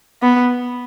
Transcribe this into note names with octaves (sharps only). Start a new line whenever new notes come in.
B3